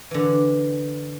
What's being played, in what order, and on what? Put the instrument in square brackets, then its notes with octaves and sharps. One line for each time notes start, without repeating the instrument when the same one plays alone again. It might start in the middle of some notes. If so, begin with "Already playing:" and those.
[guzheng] D3 E3